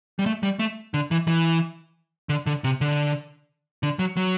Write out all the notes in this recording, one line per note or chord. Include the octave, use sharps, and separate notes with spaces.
G3
A3
G3
A3
D3
E3
E3
D3
D3
C3
D3
D3
F#3
F#3